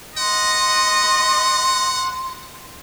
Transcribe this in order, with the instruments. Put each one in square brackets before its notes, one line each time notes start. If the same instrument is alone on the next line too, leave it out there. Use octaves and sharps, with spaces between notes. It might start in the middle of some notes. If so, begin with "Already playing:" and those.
[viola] D#5 [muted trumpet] F#5 [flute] C6